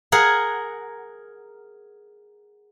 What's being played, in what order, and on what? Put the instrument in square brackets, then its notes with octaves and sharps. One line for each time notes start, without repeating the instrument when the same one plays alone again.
[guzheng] G#4 A#4 F#5